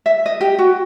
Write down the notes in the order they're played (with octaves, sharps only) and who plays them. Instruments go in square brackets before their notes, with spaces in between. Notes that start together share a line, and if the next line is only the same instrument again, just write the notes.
[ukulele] E5
D#5
G4
F#4